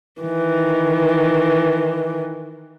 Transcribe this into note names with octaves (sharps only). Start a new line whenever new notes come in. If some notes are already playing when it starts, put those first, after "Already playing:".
D#3 E3